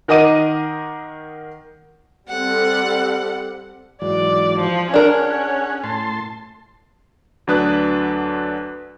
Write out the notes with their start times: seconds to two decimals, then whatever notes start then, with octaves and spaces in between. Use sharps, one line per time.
0.08 D#3 A#4 D#5 F#5 D6 D#7
2.29 G3 C4 A4 F#5
4.02 G#2 E3 F#3 D5
4.59 F3
4.94 C#4 D4 G#4 A#4 C#5 F#5
5.84 A2 A5 C6
7.47 D2 F#3 D4 B4 D#6 F#6